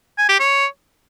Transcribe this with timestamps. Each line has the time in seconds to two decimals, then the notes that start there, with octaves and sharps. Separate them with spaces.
0.18 G#5
0.29 G4
0.40 C#5